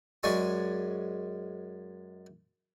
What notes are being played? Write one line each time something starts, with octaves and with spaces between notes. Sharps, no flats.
F#2 G#3 D5 G#5 C#6